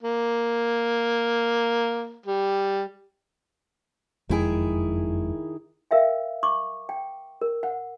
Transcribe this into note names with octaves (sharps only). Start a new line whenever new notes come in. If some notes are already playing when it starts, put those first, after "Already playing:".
A#3
G3
F#1 F2 D#3 G#3 E4 G#4
A#4 E5 F5 G5
C#6 D6
G5
A#4
F#5